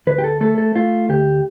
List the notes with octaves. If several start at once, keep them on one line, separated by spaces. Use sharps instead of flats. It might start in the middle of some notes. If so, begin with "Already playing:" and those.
D2 B4
G4
A4
A3 A4
A4
A3 F4
D2 G4